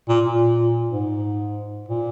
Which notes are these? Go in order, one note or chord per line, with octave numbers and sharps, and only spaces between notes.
A#2
A#2
G#2
A#2